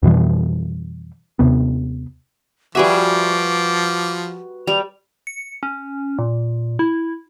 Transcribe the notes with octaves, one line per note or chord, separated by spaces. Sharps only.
F2 B2 E3 G3
D#2 C3 B3
F3 G3 F#4 G#4 B4 E5 D6
G3 F7
C#7
C#4
A#2
E4